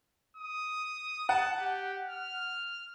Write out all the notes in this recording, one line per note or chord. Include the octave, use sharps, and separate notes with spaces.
D#6
F#5 A5
G4
F6